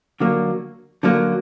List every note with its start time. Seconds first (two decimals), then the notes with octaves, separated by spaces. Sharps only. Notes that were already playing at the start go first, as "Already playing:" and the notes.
0.20 D3 F#3 A#3
1.03 D3 F#3 A#3